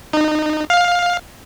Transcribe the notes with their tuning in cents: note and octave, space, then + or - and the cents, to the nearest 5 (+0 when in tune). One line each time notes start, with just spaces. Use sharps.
D#4 -25
F5 +15